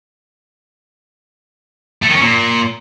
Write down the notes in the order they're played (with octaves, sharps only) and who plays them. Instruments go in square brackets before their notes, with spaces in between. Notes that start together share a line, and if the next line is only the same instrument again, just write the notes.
[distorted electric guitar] A3
D#3
C#4
A#2